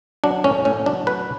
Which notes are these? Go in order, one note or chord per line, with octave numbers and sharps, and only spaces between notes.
F#3 D4
A2 C#4
A2 C#4
F#3 D4
F#3 B4